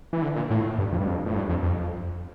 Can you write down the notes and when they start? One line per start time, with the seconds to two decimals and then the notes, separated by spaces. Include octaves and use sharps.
0.13 E3
0.22 D3
0.36 A#2
0.50 A2
0.78 G2
0.92 F2
1.00 G2
1.07 F2
1.26 A2
1.35 G2
1.49 F2
1.63 F2